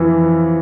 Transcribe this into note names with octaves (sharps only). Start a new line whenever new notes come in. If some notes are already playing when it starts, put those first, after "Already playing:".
Already playing: F2 E3